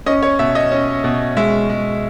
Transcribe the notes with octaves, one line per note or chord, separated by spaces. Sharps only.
C#4 D#5
C#5
B2 E5
D#5
C#4
B2
G#3 E5
G#3